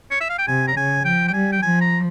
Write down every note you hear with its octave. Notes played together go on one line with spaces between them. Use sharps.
C#5
E5
F5
G5
C3 G#5
A#5
C#3 G#5
F3 G5
G5
G3 G#5
G5
F3 G#5
A#5